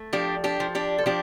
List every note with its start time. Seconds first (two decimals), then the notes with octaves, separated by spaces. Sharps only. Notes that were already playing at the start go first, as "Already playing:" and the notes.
Already playing: A3
0.13 F3 D4 G4
0.44 D4 G4
0.60 F3
0.75 D4 G4
0.98 A4
1.06 F3 D4 G4